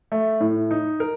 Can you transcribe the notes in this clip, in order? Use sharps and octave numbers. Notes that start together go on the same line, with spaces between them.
A3
A2
D#4
A#4